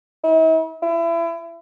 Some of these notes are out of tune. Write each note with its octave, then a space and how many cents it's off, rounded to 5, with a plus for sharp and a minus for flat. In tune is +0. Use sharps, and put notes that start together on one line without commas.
E4 -45
E4 +30